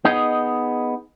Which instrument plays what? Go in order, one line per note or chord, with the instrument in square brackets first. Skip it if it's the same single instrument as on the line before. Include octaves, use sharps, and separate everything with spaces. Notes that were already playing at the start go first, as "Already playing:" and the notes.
[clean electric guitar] B3 D#4 G#4 D#5